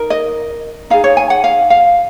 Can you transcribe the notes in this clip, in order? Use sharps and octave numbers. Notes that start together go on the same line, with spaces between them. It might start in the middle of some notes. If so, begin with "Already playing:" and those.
Already playing: D#4 A#4
D#5
D#4 G#4 F5
C#5
G#5
F#5
F5
F5